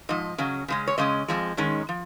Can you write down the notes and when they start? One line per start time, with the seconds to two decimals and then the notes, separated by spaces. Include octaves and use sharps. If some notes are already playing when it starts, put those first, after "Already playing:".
0.09 G#2 F3 D#5
0.38 C#3 F#3 C#4
0.68 C#3 G#3 C#4
0.87 C#5
0.98 C#3 G#3 C#4 D#5
1.28 F2 F3 G#3
1.57 G#2 D#3 G#3 C#4
1.89 F3